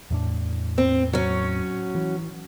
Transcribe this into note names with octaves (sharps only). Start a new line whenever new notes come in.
E2 A2 D4
C4
F#3 C#4
E3